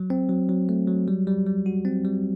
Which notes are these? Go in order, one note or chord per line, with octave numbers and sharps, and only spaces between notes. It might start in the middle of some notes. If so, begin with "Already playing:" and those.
Already playing: F#3
C4
F#3
F#3
A3
F#3
G3
G3
G3
F#4
C4
G3